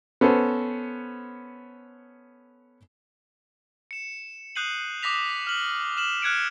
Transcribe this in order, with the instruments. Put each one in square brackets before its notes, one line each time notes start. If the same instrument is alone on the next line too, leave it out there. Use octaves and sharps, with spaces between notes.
[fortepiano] B3 C#4 A4 C5
[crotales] C#7 E7
D#6 F#6 G6 C7 D#7 F#7
D6 D#6 A#6 B6 F7
F6 F#7
F6 E7 F#7
F6 F#6 G#6 C#7 D7